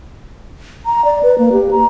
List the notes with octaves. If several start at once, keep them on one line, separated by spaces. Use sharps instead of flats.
A#5
D5
B4
A#3
G4
A#5